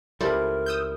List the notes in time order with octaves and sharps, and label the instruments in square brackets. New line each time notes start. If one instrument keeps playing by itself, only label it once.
[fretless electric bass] C#2 G3 [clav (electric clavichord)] E4 C5 D5 [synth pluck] A4 [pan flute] A#4
[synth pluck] D#6 E6 G6